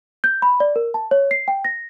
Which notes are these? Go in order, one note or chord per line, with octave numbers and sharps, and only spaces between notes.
G6
B5
D5
A#4
A5
C#5
C7
G5
A#6